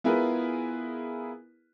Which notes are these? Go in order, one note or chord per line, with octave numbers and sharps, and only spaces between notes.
B3 E4 F4 G#4 A#4 B4